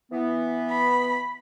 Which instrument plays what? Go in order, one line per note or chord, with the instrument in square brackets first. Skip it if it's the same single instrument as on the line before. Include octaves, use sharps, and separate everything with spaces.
[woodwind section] E3 B3
[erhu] B5